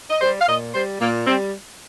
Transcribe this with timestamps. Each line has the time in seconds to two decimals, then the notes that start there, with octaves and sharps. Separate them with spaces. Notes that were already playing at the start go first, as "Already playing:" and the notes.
0.10 D#5
0.21 G3 C5
0.40 F5
0.48 A#2 D#5
0.74 G3 C5
1.00 A#2 A#3
1.27 G3 C4